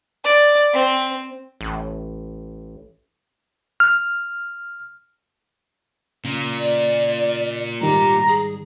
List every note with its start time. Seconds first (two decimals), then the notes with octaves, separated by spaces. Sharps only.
0.24 D5
0.73 C4
1.61 A1
3.80 F6
6.25 A#2 C#3 A#3
6.58 D5
7.81 G#2 D#3 G3 G4 A#5
8.27 G#4